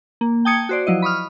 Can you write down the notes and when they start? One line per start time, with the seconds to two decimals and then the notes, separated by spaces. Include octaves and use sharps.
0.21 A#3
0.45 G5 A5 D#6 G#6 C#7
0.69 F#4 C5 D5
0.87 F3 F#3 E4 D#5
1.02 B5 C#6 D#6 F6